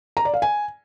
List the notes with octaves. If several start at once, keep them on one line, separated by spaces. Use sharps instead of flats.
A#5
D5
F5
G#5